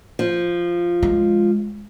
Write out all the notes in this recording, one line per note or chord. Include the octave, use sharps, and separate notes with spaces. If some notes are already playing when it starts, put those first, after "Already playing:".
F3
G#3